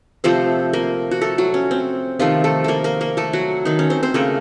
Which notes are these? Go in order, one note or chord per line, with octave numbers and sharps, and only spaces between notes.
C3 F3 A3 C4 C5
A#3 A#4
F#4
A3 A4
F#3 F#4
C#4
C4
C3 D#3 F3 A3 F4
A3 A4
A#3 A4 A#4
A#3 A#4
A#3 A#4
A3 A4
F#3 F#4
D#3 D#4
C#4
C4 C5
C4 C5
C#3 A3 A#3 A#4